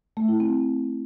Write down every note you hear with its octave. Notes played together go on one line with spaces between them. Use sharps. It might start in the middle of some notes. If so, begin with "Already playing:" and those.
A3
E4
C4